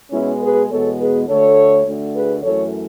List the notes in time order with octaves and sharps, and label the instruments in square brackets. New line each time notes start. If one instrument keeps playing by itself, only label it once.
[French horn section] B2 G#3 B3 C#4 E4
G#4 B4
E2 B2 G#3 B3 A4 C#5
G#4 B4
D2 D3 A3 A4 C#5
D2 D3 A3
G#4 B4
F#2 E3 A3 A4 C#5